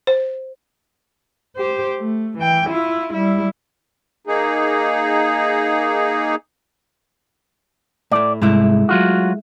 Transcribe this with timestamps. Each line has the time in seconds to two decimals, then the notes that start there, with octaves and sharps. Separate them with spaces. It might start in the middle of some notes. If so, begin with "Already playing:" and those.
0.07 C5
1.56 G4 C5
1.98 A3
2.38 E3 G5
2.68 E4 F4
3.13 G3 E4
4.27 A#3 D#4 G#4
8.11 A2 A3 D5
8.42 C2 G#2 G#3 A3 E4
8.89 F#3 F4 F#4